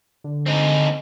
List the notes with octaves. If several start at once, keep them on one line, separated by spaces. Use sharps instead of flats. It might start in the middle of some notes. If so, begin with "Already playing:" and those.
D3
C4 D#4